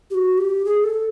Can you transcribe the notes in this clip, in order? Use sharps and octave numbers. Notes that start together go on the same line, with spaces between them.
G4
F#4
G4
G#4
A4